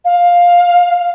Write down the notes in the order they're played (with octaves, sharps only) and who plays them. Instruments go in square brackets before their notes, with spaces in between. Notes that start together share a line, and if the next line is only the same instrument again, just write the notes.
[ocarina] F5